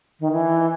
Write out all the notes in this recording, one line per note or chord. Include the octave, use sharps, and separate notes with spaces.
D#3
E3